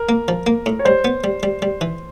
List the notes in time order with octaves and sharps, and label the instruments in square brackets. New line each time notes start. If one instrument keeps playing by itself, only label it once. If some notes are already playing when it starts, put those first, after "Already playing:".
Already playing: [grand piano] A#4
[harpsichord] A#3
F3
A#3
A2
[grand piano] C#5
[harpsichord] G3 [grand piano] C5
[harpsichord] B3
G3
G3
G3
E3